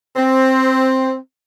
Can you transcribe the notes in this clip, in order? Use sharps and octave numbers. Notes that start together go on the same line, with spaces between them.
C4